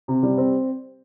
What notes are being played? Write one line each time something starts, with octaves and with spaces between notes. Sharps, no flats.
C3
G3
C4